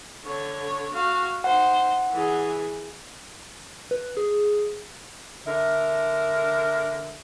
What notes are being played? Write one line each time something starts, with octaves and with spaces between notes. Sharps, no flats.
D3 C#5
F#4 F5
D#4 C5 F#5
E3 G#4
B4
G#4
D3 A#4 E5